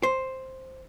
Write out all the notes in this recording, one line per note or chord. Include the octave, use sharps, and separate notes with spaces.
C5